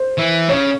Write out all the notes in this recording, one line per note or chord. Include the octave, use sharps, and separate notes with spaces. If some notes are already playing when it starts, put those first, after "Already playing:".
Already playing: C5
E3
C#3 C#5